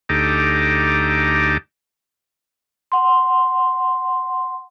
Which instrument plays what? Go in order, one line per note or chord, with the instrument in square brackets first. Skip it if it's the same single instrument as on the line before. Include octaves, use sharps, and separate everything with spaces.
[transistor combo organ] D2 D#4 G4 A4 A#5 D6
[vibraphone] F#5 C6